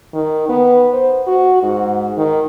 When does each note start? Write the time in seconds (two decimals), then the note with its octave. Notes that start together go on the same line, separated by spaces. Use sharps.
0.14 D#3
0.49 B3
0.93 C5
1.27 F#4
1.63 G#2
2.17 D#3